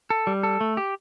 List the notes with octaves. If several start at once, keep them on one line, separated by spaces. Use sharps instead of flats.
A4
G3
A4
A3
G4